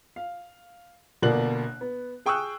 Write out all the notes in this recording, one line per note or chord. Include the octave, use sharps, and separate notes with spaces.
F5
G1 B2 A#3 D5 F#6 F#7
B3
G#4 G5 C#6 D#6 E6 F#6